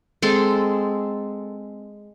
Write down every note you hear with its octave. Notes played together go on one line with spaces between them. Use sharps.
G#3 C4 A4 C6